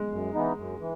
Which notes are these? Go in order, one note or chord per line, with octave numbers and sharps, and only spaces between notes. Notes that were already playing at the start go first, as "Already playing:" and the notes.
Already playing: G#3
F#2
E3 B3 D#4
F#2
E3